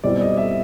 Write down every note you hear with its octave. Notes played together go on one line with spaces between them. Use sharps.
B2 G3 C4 E4 D5
D#5
E5